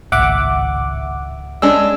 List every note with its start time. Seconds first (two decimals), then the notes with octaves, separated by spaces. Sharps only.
0.12 G#1 C#2 A2 E5 F#5 D6
1.62 G#3 C#4 D4 E6